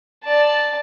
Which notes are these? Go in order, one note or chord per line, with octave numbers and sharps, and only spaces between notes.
D5 A5